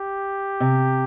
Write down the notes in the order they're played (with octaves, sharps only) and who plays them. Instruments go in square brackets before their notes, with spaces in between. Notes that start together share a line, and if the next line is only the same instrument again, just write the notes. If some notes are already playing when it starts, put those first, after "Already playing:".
Already playing: [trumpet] G4
[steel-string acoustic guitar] C3